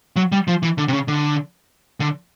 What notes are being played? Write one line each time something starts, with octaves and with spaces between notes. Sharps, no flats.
F#3
G3
F3
E3
D3
C3
C#3
D3
D3